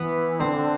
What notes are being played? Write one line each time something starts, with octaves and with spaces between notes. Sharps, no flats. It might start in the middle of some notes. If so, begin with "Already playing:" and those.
Already playing: E3 B3 B4
D3 C4 C5